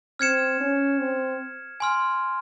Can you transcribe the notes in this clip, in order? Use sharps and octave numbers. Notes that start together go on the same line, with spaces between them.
C4 F6 G#6 C#7 E7
C#4
C4
G#5 C6 F6